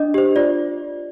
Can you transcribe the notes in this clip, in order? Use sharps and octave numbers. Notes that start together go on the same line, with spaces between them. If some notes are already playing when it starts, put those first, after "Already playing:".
Already playing: D4 D#5
G4 C5
F4 D5